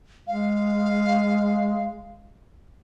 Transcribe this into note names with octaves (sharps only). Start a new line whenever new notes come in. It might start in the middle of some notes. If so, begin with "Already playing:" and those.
G#3 F5